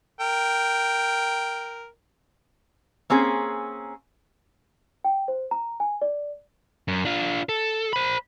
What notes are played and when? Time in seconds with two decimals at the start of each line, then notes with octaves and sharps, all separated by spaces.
0.20 A#4 G5
3.10 A#3 C4 C#4 G#4
5.04 G5
5.28 C5
5.51 A#5
5.80 G#5
6.02 D5
6.88 F#2
7.05 D4 F4
7.49 A4
7.93 C5 B5